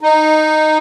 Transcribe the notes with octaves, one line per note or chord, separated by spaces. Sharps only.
D#4